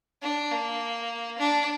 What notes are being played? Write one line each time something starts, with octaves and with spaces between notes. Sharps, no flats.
D4
A#3
D4